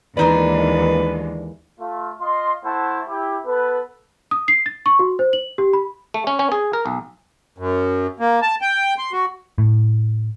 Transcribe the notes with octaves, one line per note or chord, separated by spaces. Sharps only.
D#2 E3 G#3 D4 D#4 B4 D5
A3 F4
F4 D#5 C6
A3 E4 C5 F#5 A5
E4 G4
B3 A4 B4
D#6
C7
A6
C#6
F#4
C5
F#7
G4
B5
A3
C#4
C#4
G#4
A#4
B1
F#2
A#3
A5
G5
C6
F#4
A2